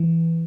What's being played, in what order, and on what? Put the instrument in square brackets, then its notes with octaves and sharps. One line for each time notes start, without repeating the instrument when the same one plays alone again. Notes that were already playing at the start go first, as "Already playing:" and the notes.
Already playing: [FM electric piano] E3